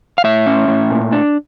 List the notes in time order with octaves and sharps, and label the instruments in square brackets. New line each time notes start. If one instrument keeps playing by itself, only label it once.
[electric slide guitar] F5
A2 E5
C#4
A2
A#2
D4